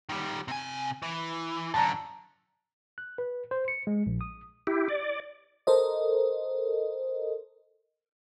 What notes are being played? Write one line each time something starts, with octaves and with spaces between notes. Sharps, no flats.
D#3 G3
C3 G#5
E3
F#2 D3 A5 A#5
F#6
B4
C5
C#7
G#3
A#1
D#6
E4 G4
D5
A4 A#4 C5 D#5